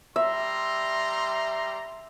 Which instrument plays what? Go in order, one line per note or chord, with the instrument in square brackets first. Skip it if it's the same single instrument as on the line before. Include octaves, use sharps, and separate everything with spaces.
[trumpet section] G3 A#5 C6 [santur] E5